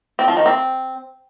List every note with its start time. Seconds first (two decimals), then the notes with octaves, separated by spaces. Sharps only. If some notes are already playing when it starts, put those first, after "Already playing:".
0.19 C4
0.28 F3
0.37 D#3
0.46 C4